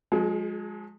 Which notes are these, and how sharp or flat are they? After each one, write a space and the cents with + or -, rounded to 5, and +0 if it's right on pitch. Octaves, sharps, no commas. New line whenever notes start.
F3 +45 G#3 +0 G#4 +40